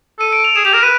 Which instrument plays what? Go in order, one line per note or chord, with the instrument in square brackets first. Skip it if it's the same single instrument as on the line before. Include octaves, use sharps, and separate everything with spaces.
[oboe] A4 [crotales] D#7
[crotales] D7
F7
[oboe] G#4 [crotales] E7
[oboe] G4 [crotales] F7
[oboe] A#4 [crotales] E7
[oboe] B4 [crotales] D#7